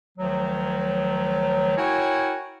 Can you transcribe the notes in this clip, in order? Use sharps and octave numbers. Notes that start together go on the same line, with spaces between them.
D2 D#3 F3 F#3
E4 F#4 A#4 C#5 G5 G#5